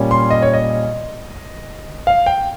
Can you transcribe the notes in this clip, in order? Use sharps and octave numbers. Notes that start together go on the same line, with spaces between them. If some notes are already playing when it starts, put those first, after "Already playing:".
Already playing: A#2 G3 C#4
C6
D#5
C#5
D#5
F5
G5